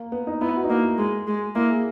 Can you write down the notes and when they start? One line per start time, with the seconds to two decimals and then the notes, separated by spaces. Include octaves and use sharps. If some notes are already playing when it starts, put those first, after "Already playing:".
Already playing: A#3
0.12 B3
0.27 D#4
0.41 B3 E4
0.56 F#4
0.64 D#4
0.69 A#3 E4
0.98 G#3
1.27 G#3
1.55 A#3 E4
1.69 G#4